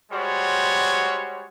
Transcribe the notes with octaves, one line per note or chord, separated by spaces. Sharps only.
G3 G#3 F#4 C5 C#5